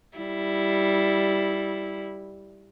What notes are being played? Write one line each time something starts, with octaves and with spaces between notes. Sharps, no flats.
G3 E4